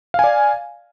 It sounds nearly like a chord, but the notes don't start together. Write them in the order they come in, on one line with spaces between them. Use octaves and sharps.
F5 G#5 D5